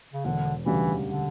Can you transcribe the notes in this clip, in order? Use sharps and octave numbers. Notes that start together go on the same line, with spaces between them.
C#3
E1 D3
D2 C#3 E3 G3
D3